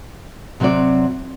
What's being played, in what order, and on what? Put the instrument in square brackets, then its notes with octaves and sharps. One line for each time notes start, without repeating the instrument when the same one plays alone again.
[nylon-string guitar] C3 F#3 C4 F#4 D5